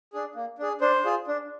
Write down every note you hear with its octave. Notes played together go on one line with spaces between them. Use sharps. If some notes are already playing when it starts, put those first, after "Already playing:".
D4 G#4
A#3
D4 G#4
D4 C5
F4 G#4
D4